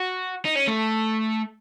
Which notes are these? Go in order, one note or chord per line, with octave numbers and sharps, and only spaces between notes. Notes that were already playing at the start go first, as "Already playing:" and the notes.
Already playing: F#4
D#4
C#4
A3